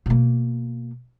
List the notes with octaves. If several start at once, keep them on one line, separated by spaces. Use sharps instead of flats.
B2 A#3